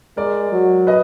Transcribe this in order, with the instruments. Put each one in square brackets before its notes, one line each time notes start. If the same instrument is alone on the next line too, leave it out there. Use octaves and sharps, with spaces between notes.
[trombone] G#3 [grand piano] A#4 D5
[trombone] F#3
[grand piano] B4 D#5